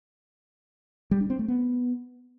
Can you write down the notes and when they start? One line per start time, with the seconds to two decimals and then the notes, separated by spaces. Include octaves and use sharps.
1.11 G3
1.21 D4
1.30 C4
1.39 A3
1.48 B3